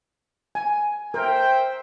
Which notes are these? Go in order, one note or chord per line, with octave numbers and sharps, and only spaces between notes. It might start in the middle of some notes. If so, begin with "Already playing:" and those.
G#5
A#4 C5 E5 G5